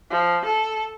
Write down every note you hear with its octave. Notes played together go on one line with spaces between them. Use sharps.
F3
A4